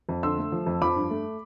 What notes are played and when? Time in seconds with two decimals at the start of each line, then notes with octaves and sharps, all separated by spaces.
0.09 F2
0.23 D3 C6 E6
0.38 A3
0.52 F3
0.66 F2
0.82 F3 B5 D6
0.96 G2
1.10 A3